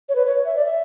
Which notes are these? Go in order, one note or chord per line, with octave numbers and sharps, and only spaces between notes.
C#5
B4
C#5
E5
D5
E5